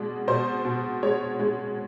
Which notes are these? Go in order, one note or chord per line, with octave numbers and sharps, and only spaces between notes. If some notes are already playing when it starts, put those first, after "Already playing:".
Already playing: B2 G#3 D5
B2 C5
B2
G#3 C#5
G#3